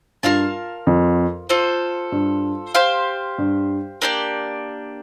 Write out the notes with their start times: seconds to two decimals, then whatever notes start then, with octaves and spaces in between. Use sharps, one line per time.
0.23 G2 F4 A#4 F5 A5
0.87 F2
1.49 F4 A4 C5
2.12 G2
2.75 G4 C5 F5
3.38 G2
4.02 A#3 D4 G4 D5